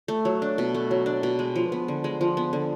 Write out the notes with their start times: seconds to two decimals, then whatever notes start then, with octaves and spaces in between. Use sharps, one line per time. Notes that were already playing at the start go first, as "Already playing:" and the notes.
0.08 A3
0.25 F#3
0.42 D4
0.58 B2
0.74 A3
0.91 F#3
1.06 D4
1.23 B2
1.39 G#3
1.56 F3
1.72 B3
1.88 D3
2.04 G#3
2.21 F3
2.37 B3
2.53 D3